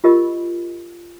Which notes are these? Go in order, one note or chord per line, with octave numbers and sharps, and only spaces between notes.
F4 G4 A#4 D#5 B5 E6